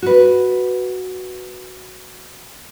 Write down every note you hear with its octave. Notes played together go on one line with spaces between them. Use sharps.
F#4 B4